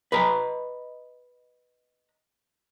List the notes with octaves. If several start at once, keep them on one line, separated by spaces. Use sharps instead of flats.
B4 D#5 A#5